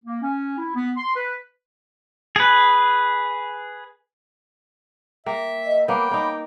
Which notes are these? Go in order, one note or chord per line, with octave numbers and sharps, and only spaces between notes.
A#3
C#4
E4
B3
C6
B4
G#4 B4
A#3 E5 G5
D#5
A#3 B3 C#5 F5 G5 B5 D6
A#3 D#4